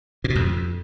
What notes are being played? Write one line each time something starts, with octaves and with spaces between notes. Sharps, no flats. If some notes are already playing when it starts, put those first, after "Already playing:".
A#2
B2
F2